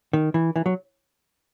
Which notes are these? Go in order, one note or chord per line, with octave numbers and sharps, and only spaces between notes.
D#3
E3
E3
F#3